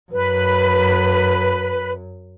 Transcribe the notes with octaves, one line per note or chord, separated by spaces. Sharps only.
F#2 B4